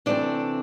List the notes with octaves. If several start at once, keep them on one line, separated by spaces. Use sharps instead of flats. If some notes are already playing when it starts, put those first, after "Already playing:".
C3 E3 A3 C4 D4 D5